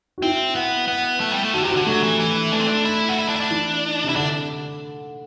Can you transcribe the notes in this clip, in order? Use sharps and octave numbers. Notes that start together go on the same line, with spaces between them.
F#4
C4 E4
B3
B3
A3
G3
A3
D3 F#4
G4
C3
F#4
D3 D4
F#3 A3
E3
E3
A3 D4
C4
D4
E4
F#4
E4
D4
E4
D4
E3
C3 E4
D3 D4